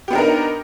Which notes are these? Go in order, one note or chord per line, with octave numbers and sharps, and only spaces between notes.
B3 D4 D#4 G4 A#4